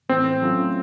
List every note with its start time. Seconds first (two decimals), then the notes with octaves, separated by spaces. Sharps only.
0.09 A2 E3 A3 C4
0.42 F#3 A3 C#4 F4